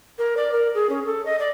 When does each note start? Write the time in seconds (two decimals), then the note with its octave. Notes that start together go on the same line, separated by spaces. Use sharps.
0.19 A#4
0.37 D5
0.52 A#4
0.75 G#4
0.90 C#4
1.06 A4
1.26 D#5
1.39 D5